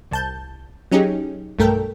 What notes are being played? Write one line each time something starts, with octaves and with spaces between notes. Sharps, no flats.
C2 A5 G6
F#3 C#4 D#4 G4 G#4
B1 G2 A3 A4 A#4 G5